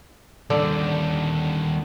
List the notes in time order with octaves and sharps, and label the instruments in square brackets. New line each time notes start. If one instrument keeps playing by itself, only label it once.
[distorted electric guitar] D#2 G3 [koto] D3